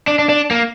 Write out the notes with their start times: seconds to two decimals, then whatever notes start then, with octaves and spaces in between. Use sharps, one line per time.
0.07 D4
0.19 D4
0.29 D4
0.51 A#3